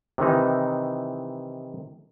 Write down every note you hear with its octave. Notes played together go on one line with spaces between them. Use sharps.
C3 D#3 E3 D#4